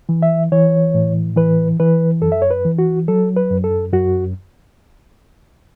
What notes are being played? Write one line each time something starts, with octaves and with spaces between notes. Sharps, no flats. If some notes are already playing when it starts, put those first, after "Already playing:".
E3
E5
E3 C#5
A2
E3 B4
E3 B4
F#2 A4
E5
C#5
B4
E3
F#4
F#3 A4
B4
F#2
A4
F#2 F#4